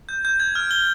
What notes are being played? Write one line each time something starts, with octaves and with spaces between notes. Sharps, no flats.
G6
G6
G#6
F6
G7